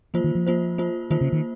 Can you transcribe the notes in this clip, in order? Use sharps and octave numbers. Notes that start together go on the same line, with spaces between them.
F3 A#3 F4 C5
D#3
F3
A#3 F4 C5
A#3 F4 C5
D#3 A#3 F4 C5
C#3
D#3